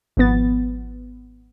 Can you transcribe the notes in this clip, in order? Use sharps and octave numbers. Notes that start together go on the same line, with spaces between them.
G#1 F3 B3 A6